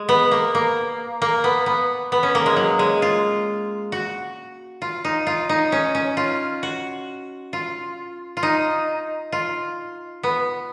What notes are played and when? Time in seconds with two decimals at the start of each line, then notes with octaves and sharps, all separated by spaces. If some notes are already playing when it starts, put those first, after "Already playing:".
Already playing: G#3
0.09 B3
0.31 A#3
0.55 A#3
1.22 A#3
1.44 B3
1.66 B3
2.12 B3
2.23 C#4
2.35 A#3
2.46 G#3
2.56 F#3
2.79 G#3
3.02 F4
3.92 F#4
4.82 F4
5.05 D#4
5.27 F4
5.49 D#4
5.72 C#4
5.95 C#4
6.17 F4
6.63 F#4
7.53 F4
8.37 F4
8.43 D#4
9.32 F4
10.23 B3